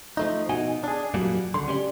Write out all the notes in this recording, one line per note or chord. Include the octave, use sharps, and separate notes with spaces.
F3 A3 D#4
B2 D#4 F#4 G#5
D4 G#4
F2 A#2 F#3 G3 A#3
C#2 D3 C6
C#4 G4 D5